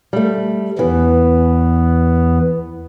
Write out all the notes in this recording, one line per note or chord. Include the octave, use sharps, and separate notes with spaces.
G3 A3
E2 E3 B3